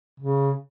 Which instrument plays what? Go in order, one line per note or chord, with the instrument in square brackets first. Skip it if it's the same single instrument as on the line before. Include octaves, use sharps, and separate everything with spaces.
[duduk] C#3